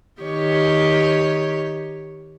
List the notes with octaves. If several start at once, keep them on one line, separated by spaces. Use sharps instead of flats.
D#3 G4 C#5